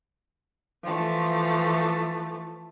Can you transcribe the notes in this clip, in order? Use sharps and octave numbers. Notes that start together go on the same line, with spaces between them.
E3 F3 A3